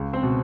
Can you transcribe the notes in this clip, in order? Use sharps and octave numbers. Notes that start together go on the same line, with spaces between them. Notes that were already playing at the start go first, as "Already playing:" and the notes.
Already playing: C#2
C4 C5
B2